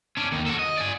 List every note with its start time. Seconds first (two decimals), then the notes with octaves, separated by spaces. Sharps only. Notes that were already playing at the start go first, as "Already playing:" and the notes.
0.17 C#4 D4
0.32 D#2 D#3
0.46 F#4 A4
0.59 D#5
0.77 D5 G#5